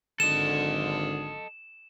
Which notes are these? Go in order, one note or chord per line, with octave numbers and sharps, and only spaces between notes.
G#1 D3 A4 D#5 E7